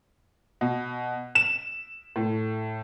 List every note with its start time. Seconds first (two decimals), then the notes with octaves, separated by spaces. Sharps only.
0.61 B2
1.35 E7
2.16 A2